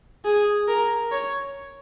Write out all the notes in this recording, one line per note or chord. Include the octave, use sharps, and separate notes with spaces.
G#4
A#4
C#5